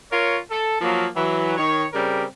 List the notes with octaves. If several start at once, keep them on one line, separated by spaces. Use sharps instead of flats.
F4 A#4 C#5
A4
F3 F#3 A#3
E3 F#3
D#3 C#5
C#3 G3 C4 G4 A#4